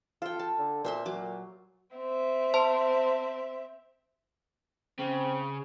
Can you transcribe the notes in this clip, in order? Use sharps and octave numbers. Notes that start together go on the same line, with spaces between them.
F4 A4 G5
A5
D3
A#2 C5 E5 C6
A#2 F#3 D6
C4 E5
C5 A5 C6
C#3 C4